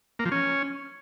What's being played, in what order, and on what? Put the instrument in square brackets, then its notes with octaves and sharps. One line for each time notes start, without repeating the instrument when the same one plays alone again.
[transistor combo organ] A#3
F3
C#4